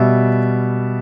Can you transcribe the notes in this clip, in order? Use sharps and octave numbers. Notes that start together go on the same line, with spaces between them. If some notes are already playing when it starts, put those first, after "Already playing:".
Already playing: B2 G3 E5